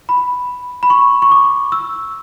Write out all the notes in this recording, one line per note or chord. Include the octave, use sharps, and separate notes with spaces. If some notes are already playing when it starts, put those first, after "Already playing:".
B5
B5
C#6
C#6
D6
E6